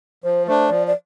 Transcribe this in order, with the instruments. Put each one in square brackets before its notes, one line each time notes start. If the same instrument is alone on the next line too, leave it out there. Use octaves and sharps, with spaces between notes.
[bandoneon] F3 [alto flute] C5
[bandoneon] A3 D4 [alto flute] C5
[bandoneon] F3 [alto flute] D5
[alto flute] D5